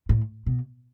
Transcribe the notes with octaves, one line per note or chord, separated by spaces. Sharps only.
A2
B2